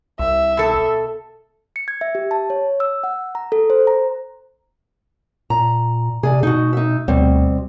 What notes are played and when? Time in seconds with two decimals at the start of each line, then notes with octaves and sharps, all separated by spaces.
0.19 C2 E5
0.57 B2 A4
1.76 C#7
1.88 G#6
2.01 E5
2.15 G4
2.31 A5
2.50 C#5
2.80 E6
3.04 F#5
3.35 A#5
3.52 A4
3.70 C5
3.87 A#5
5.50 A#2 A#5
6.23 C3 G#4 D5 G#5
6.43 B2 D#4 F#4
6.73 D#4 E5
7.08 D2 B2 G3 C4